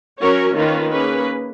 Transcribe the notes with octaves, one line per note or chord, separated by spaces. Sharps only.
F#3 C#4 F#4 A#4 C#5
D#3 A#3 C#4 F4 B4
A#3 C#4 G#4 B4